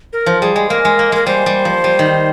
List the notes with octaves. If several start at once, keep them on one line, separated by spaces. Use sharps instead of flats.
A#4
F3
G3 G#4
G#3
A#3 A#4
G#3
A#3
G#3 A#4
G3 C5
G3
F3
G3
D#3